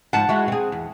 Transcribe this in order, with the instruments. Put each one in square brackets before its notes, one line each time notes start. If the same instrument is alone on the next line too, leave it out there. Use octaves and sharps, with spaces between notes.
[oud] G#2 F3 [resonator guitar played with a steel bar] F#5 A5
[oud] G#3 E4 F#4
C4 G#4
E2